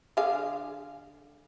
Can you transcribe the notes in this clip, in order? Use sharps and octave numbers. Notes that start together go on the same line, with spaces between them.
D3 G#4 F5